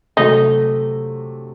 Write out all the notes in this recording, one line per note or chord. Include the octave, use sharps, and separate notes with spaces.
C3 F#3 A3 D#4